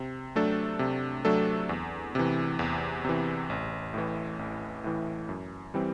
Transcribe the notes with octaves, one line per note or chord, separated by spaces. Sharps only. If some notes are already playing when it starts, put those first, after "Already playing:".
Already playing: C3
F#3 A3 D4 A4
C3
F#3 A3 D4 A4
E2
C3 E3
E2
C3 E3
A1
A2 E3
A1
A2 E3
F#2
E3 G3 C4 G4